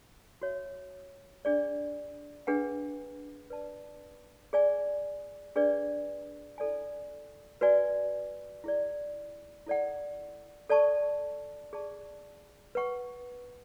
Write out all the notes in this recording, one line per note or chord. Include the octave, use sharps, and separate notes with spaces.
F#4 C#5 E5
D4 G#4 D5
D4 G#4 B4 F#5
B4 D5 A5
G#4 D5 G#5
D4 G#4 B4 D5
E4 A4 D5 G#5
F#4 B4 D5 G#5
E4 G#4 D5
E4 A4 D5 F#5
A4 D5 A5 C#6
G#4 D5 A5 C#6
B4 F#5 C#6